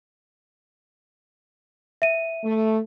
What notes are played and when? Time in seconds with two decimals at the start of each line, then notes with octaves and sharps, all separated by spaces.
2.02 E5 D#7
2.44 A3